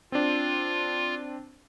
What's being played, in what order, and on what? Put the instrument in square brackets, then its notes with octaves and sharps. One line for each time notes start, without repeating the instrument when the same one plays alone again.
[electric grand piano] C4 D4 [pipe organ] F4